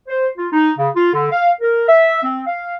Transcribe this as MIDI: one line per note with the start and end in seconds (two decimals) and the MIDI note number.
0.08 0.27 72
0.38 0.48 65
0.53 0.70 63
0.78 0.88 49
0.95 1.13 65
1.13 1.26 50
1.32 1.50 77
1.61 1.83 70
1.87 2.19 76
2.23 2.41 60
2.47 2.73 77